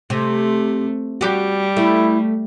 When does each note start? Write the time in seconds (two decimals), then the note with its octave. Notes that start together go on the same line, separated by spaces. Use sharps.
0.10 C3 A3
1.21 G3 F#4 G4
1.77 A3 E4